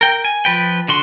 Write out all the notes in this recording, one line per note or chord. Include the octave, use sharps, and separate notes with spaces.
A#4 G5
G#5
F3 B4 G5
D3 F#4 C6